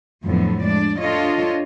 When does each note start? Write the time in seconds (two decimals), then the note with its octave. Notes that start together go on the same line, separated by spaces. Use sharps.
0.24 F2 A2 D3 F#3 B3
0.64 G#3 D4 D5
1.01 D4 F4 A4 C#5 D#5